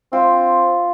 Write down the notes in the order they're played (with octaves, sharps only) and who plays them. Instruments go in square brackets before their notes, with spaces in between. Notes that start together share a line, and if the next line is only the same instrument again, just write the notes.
[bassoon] C4 [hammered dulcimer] F4